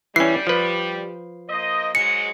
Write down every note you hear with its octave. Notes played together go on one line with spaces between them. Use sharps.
E3 G3 C#4 C7
F3 B4
A#3 C5 D#5
G#2 F#3 G#3 C#7